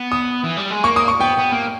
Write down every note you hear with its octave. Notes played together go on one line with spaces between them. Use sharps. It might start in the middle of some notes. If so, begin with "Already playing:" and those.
Already playing: B3
D#6
E3
G3
G#3
A#3 C#6
D#6
C#6
B3 G5
B3
A#3